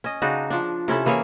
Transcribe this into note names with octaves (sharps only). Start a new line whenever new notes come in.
C#4 D#5
C#3 D4 D#4 F#4
F3 D4
C3 C#4 E4 A4
E3 A#3 G#4 C#5